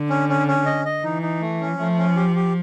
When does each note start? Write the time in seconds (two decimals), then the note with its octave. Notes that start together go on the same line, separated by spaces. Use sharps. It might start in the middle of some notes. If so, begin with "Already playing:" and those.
Already playing: D3
0.10 C#4
0.29 C#4
0.48 C#4
0.66 D#5
0.85 D#5
1.03 E3 D#4
1.22 D#4
1.41 A3
1.61 C#4
1.79 F3 A3
1.98 C#4
2.16 G4
2.35 G4